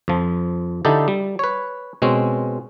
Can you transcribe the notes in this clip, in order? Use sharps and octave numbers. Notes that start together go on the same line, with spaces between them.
F2 F3
D3 D#4 E4 G4 A4
G3
B4 C#5
B2 G#3 C4 C#4